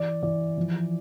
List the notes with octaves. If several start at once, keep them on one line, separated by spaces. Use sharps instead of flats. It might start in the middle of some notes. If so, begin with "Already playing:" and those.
Already playing: E3 D5
E3 D5
F3